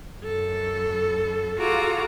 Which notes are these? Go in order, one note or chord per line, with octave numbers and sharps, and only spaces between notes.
F#2 A4
F4 F#4 G#4 A4 A#5 D6